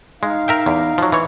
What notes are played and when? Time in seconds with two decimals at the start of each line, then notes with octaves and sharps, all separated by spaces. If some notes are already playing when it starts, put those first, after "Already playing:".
0.23 G#3 D#4 F5
0.48 A#4 E5 G5
0.66 E2
0.98 F3 F#3
1.12 E3 C#5